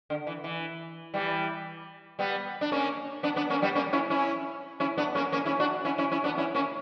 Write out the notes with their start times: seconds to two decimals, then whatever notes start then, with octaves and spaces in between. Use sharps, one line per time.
0.10 D3
0.27 E3
0.44 E3
1.14 E3 G3
2.19 G3 B3
2.61 D4
2.72 A#3 C#4
3.23 B3 D4
3.36 B3 D4
3.50 A#3 C#4
3.62 G3 B3
3.75 A#3 C#4
3.93 C#4 E4
4.10 C#4 E4
4.80 C#4 E4
4.98 B3 D4
5.15 A#3 C#4
5.32 A#3 C#4
5.45 C#4 E4
5.60 D4 F#4
5.85 C#4 E4
5.98 C#4 E4
6.12 C#4 E4
6.24 B3 D4
6.38 C#4 E4
6.54 A#3 C#4